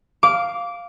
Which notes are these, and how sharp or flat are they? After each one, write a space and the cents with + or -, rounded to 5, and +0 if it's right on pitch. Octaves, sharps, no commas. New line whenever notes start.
F5 +0 D6 -15